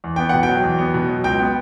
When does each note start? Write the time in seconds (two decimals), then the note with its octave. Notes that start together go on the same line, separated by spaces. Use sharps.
0.04 E2
0.16 B3 G5
0.29 B2 F#5
0.43 G5
0.49 F#3
0.63 E2
0.79 B3
0.94 B2
1.09 F#3
1.24 C#2 G5
1.39 B3